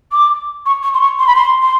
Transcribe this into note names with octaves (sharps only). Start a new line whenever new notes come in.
D6
C#6
C#6
C6
C#6
C6
B5
C6
C6